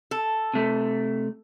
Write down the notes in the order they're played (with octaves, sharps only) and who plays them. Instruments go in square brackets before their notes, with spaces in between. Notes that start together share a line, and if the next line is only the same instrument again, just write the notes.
[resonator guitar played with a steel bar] A4
[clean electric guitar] C3 A3